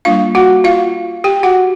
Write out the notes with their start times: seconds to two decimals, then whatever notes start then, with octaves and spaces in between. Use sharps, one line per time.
0.05 G3 A#3 D4 F4 F5
0.35 F#4 F#5
0.64 F4 F5
1.24 G4 G5
1.43 F#4 F#5